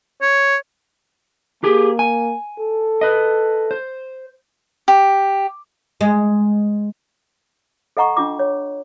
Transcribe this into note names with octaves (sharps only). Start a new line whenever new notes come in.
C#5
A#3 G4 G#4
G#5
A4
B4 D#5
C5
G4
G#3
A4 D#5 F#5 A#5 C#6
D4 F4 D6
C#5